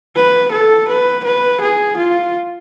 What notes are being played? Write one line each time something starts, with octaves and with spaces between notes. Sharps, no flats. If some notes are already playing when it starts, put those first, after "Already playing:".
B4
A4
B4
B4
G#4
F4